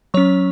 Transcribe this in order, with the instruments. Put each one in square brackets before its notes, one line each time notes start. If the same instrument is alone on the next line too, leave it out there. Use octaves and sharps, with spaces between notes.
[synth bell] F#3 C#4 C#5 C#6